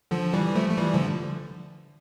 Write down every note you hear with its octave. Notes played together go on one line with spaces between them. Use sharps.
D3 F3
E3 G3
F3 A3
A3
E3 G3
D3 F3